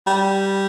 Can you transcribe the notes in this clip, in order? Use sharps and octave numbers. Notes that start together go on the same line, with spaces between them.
G3